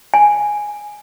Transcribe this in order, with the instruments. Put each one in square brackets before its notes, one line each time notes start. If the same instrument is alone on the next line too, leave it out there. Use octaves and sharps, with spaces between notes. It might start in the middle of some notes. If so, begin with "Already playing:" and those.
[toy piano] G#5